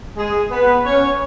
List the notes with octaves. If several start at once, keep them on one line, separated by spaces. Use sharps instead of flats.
G#3 G#4
B3 B4
C#4 C#5